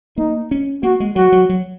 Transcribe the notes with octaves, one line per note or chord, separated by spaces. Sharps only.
A#3 D#4
C#4
A#3 F#4
G#3
F#3 F#4
F#3
F#3